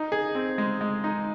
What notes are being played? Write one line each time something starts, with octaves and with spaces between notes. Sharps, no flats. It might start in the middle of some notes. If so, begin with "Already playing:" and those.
Already playing: D#4
G#4
C4
G#3
G#3
D#4